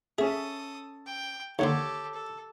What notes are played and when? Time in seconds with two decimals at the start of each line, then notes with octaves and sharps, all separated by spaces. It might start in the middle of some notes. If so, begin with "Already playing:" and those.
0.18 C#4 G#4 A4 E5 D#6
1.06 G5
1.59 D#2 D3 G4 A4 C#5 C6
2.14 A4